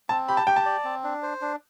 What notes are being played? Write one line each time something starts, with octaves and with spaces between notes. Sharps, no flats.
C4 A5
G4 B5
A5
G4 G5
A5
D5
C4
D4
C5
D4